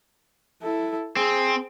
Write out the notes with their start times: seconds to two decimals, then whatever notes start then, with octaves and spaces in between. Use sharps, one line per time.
0.62 E4 A4
1.16 C4 G#4